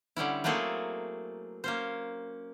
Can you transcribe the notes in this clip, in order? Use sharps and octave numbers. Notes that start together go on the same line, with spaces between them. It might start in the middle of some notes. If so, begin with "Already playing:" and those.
D3 G3 C#4 E4
F#3 A3 A#3 C4 G#4 A4
A#3 C#4 C5